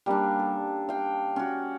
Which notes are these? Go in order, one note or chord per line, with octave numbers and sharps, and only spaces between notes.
G3 A#3 C#4 D4
A4
F5 G5
C#4 F#4